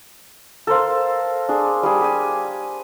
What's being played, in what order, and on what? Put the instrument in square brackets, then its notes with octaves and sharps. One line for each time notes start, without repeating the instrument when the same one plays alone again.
[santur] A4 A#4 C5 F5
D4 G#4
G3 G#4
G4 G#5